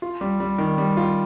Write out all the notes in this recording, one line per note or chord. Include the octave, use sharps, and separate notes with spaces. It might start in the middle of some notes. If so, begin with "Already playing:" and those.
F4
G3
G3
D#3
G3
F4